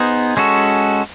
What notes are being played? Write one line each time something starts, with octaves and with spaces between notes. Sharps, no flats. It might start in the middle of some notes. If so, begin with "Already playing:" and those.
Already playing: B3 D#4 G#4 C5
G#3 C#4 F#4 A4